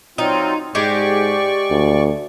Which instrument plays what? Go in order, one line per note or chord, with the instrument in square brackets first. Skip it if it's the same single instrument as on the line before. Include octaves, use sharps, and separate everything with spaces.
[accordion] F#3 C4 F4 [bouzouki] D#4
[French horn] G#2 [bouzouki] G#3 G4 [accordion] D5 C#6
[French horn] D2